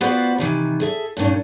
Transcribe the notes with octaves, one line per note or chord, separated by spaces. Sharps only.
B3 F4 F#4 B4 C5 D5
C3 D#3 E3
G#4 A4 E5
G2 A#2 D#3 C#4 D4